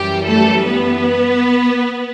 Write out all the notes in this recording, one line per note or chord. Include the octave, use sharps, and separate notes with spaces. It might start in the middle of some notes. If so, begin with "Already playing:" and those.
Already playing: F#2 E3 G3 G4
A3 A4
B3 B4